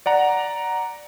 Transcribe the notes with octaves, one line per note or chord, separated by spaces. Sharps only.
D5 F#5 A#5